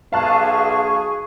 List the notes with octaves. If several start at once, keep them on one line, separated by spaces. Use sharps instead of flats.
B1 G#4 F5 A5 C#6 F#6